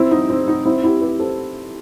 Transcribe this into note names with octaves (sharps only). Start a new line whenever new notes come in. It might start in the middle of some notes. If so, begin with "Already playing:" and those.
Already playing: C4 E4
D#4
C4
D#4
C4 E4
E4 G4
G4 B4
A4 C5